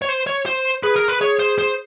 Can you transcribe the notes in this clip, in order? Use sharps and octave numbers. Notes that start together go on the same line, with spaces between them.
C#5
C5
C#5
C5
G#4 B4
A#4
B4
G#4 C#5
C5
C5